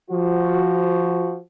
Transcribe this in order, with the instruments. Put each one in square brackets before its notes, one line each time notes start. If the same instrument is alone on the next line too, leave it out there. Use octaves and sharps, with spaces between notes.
[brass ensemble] F3 F#4